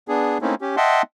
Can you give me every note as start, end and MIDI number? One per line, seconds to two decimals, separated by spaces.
0.08 0.38 59
0.08 0.38 62
0.08 0.38 68
0.42 0.55 57
0.42 0.55 58
0.42 0.55 60
0.42 0.55 61
0.42 0.55 63
0.42 0.55 64
0.61 0.76 61
0.61 0.76 67
0.77 1.02 75
0.77 1.02 76
0.77 1.02 78
0.77 1.02 79
0.77 1.02 81
0.77 1.02 84